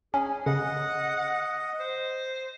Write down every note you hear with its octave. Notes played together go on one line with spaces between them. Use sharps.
C#4 G#4
C#3 D#5 F#5
C5